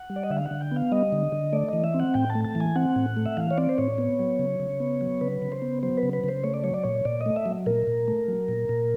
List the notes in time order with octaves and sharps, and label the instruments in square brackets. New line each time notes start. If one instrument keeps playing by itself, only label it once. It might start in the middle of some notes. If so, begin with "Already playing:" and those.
Already playing: [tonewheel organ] F#5
G3
D5
D#5
D3 E5
F5
F#5
D3
G5
B3 F5
G3 D#5
D3
D3
A3 D5
E3 D#5
E5
C4
F#5
A2 G5
A5
A3
A5
E3
G#5
C4 F#5
A2
A3
E5
E3 F5
C#5
C4 D5
C5
A2 C#5
B3
F#3
C#3
C#3
B3
F#3
C#3 B4
C#3
C5
B3
F#3 C5
B4
C#3
B4
C#3
C5
A3 C#5
D5
F#3 C#5
D5
A#2 C#5
A#2 D5
D#5
A3
E5
F#3
A#2 A#4
A#2
A3
F#3
A#2
A#2